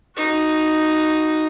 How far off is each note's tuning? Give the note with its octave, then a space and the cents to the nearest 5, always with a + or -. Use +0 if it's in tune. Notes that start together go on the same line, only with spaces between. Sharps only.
D#4 +0 F#4 +0